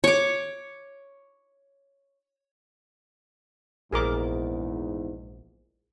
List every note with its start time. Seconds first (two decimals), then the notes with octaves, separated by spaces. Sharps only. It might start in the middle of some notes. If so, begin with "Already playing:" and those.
0.04 C#5 D6
3.92 A#1 E2 G#2 G#4 A#4 D6